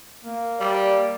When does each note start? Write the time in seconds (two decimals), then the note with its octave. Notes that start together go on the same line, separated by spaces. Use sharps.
0.23 A#3
0.60 G3 D5